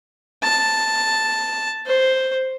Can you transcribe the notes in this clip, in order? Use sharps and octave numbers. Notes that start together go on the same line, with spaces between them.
A5
C5